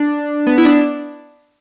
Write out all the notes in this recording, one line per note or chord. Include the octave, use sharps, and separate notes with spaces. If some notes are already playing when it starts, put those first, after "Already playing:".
Already playing: D4
B3
E4
D4